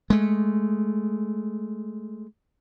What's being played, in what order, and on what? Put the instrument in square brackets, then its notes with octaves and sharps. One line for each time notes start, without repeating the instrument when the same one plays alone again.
[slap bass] G#3 A3